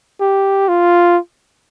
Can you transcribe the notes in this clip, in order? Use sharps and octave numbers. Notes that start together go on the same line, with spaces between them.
G4
F4